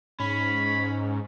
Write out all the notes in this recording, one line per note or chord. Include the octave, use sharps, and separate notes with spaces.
G#2 C#4 B5